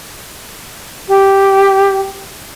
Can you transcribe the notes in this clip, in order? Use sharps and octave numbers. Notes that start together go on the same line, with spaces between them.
G4 G5